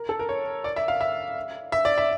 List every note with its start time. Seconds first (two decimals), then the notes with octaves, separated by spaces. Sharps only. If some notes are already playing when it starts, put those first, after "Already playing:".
Already playing: A#4
0.09 A4
0.19 A#4
0.29 C#5
0.64 D5
0.76 E5
0.88 F5
1.01 E5
1.72 E5
1.85 D5
1.98 E5